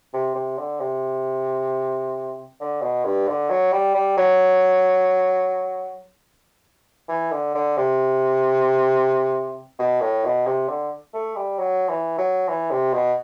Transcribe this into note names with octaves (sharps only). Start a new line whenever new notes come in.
C3
C3
D3
C3
D3
B2
G2
D3
F#3
G3
G3
F#3
E3
D3
D3
C3
B2
A2
B2
C3
D3
A3
G3
F#3
E3
F#3
E3
C3
B2